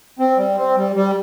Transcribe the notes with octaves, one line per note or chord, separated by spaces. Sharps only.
C4
G3
C4
G3
G3